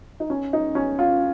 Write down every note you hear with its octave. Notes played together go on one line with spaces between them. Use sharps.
D#4
C#4
D#4
C#4
F4